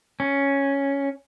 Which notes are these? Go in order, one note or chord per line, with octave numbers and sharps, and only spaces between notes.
C#4